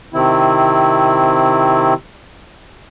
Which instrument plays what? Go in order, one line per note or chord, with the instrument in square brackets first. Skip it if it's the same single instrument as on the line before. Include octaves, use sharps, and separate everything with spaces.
[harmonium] C3 D#3 C4 E4